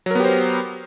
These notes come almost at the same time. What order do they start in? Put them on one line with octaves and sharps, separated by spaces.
F#3 A#4 B3 G4 C5